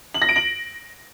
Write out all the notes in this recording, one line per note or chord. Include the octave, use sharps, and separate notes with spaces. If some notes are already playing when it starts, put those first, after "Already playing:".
F#7
A#6
D7
F#7